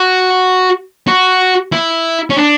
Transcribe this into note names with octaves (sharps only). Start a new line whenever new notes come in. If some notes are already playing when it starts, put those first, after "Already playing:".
Already playing: F#4
F#4
E4
C#4
D4